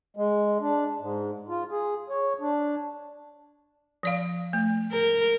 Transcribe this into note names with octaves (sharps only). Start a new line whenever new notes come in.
G#3
D4
G#2
F4
G#4
C#5
D4
F3 D5 F5
A3
A#4